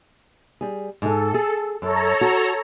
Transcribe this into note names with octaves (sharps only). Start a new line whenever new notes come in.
G3 G#4
G#2 G#3 A4
G#4
F#2 A4 C#5 A#5
F#4